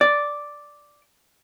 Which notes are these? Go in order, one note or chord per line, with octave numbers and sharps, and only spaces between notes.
D5